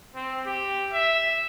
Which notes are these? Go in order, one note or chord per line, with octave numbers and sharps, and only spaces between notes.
C4
G4
E5